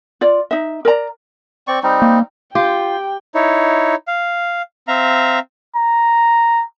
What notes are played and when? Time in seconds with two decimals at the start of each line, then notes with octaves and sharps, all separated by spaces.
0.21 F4 D5
0.51 D#4 E5
0.85 A#4 D5 A#5
1.68 C4 D5 C#6
1.83 G3 C4 D#4
2.02 A#3
2.55 F4 G4 G5
3.35 D#4 E4 C#5
4.08 F5
4.88 C4 E5 F5 A#5
5.76 A#5